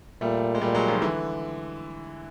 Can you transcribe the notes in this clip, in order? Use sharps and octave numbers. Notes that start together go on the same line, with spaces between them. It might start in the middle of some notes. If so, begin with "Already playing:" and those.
A#2 G3 A3
G#3
A#2 G3 A3
F#3 G#3
D#3 F3
D3 E3